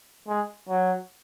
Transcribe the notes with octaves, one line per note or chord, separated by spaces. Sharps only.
G#3
F#3